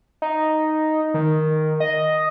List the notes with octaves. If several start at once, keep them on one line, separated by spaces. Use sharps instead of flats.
D#4
D#3
D#5